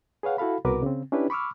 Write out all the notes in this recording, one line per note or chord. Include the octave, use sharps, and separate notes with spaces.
G#4 B4 C#5 F5 F#5
E4 F#4 A4 F5 B5
C2 B2 F#4 A#4 B4 D6
C#3 C4
C#4 D4 E4 G4 B4
B5 C#6 D6 E6 F6